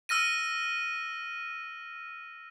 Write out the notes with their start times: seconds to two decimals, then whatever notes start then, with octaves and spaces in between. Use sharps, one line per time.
0.09 E6 F6 A#6 D#7